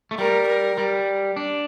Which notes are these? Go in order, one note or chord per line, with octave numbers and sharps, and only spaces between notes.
A3
G3 A#4
A#4
G3
D4